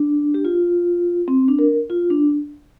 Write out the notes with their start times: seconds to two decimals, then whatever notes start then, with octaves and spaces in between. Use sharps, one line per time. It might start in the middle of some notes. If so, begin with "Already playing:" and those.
Already playing: D4
0.34 G4
0.45 F4
1.28 C4
1.48 D4
1.59 A#4
1.90 F4
2.10 D4